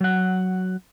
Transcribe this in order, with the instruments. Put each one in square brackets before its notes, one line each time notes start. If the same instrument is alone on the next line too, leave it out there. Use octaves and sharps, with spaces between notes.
[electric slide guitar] F#3 F#5